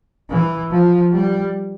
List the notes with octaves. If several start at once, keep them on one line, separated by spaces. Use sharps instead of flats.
E3
F3
G3